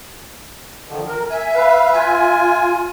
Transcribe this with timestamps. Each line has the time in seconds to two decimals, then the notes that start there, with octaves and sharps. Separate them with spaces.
0.88 D3 D#3 F3
1.07 A#4
1.30 E5 G#5
1.54 B4 F5
1.93 F4 G#5